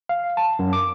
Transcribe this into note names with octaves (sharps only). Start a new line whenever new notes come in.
F5
A5
F#2
D6